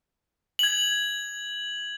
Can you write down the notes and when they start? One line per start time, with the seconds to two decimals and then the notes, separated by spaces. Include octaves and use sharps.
0.59 G#6 F#7